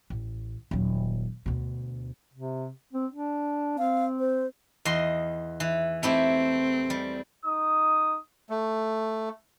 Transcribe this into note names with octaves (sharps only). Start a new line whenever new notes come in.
A1
D#1 F#3
D2 B2
C3
C4
D4
C4 F5
C5
E2 D#5 C6
E3
A3 C4 E4 G4
G3
D#4 D#6
A3